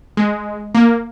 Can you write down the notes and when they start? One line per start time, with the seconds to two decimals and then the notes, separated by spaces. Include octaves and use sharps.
0.17 G#3
0.75 A#3